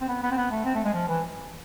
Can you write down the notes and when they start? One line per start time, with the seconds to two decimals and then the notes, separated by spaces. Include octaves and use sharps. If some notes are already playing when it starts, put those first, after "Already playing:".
0.01 C4
0.08 B3
0.23 B3
0.31 C4
0.37 B3
0.51 A3
0.64 C4
0.75 A3
0.84 G#3
0.94 F3
1.08 E3